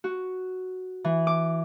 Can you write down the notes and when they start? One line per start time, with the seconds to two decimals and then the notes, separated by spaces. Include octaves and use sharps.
0.04 F#4
1.04 E3
1.27 D6